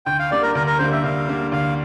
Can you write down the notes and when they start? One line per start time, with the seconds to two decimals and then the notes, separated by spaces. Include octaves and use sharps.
0.06 D2 G5
0.19 F5
0.31 D3 G3 A#3 D5
0.42 A#4
0.55 D2 A#4
0.67 A#4
0.79 D3 G3 A#3 C5
0.92 E5
1.04 D2 F5
1.28 D3 G3 A#3
1.52 D2 F5